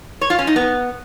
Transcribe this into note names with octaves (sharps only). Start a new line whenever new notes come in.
C#5
F4
C#4
D#4
B3